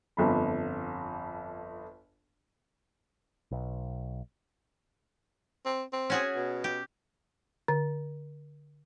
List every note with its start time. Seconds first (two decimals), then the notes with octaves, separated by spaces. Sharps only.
0.17 G1 F2 B5
3.51 B1
5.65 C4
5.93 C4
6.10 C#4 F#4 G#4
6.36 B2
6.64 G4
7.68 D3